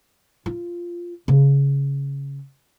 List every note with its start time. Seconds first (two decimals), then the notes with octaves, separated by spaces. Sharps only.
0.46 F4
1.28 C#3